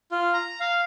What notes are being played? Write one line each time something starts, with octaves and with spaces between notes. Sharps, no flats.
F4
A#5
F5